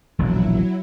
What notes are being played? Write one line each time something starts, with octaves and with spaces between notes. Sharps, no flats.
E1 A#1 A#2 F#3 E4